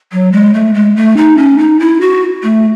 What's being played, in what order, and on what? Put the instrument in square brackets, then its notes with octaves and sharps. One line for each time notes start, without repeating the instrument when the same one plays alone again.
[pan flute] F#3
G#3
A3
G#3
A3
D#4
C#4
D#4
E4
F#4
A3